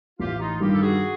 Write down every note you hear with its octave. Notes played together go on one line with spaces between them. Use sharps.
A1 F4 G4
D#4 F4
G2 D#3 G3 F4 G4
A4
F#4 G#4